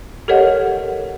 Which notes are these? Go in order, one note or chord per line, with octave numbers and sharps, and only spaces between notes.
G4 A4 A#4 C#5 D#5 F#5